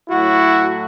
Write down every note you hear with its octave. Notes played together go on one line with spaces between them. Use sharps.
A2 F#3 A3 E4 F#4